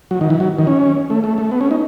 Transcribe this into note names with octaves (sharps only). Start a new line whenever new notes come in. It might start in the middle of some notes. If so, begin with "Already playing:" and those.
F#3
D#3
E3
F#3
D#3
C#4
A3
A3
A3
B3
C#4
D#4